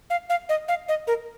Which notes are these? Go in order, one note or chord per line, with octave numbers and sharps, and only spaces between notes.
F5
F5
D#5
F5
D#5
A#4